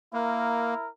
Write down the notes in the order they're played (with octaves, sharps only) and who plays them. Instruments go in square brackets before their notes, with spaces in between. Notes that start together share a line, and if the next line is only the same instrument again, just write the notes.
[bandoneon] A#3 [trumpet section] E4 A#4